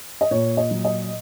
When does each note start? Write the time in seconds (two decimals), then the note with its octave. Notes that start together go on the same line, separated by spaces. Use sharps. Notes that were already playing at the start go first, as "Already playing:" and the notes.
0.21 D#5
0.31 A#2 C#5
0.57 D#5
0.71 F#3
0.85 D#5